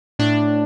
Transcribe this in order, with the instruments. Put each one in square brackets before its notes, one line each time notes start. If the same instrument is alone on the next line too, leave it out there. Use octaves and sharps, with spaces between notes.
[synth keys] A2 D4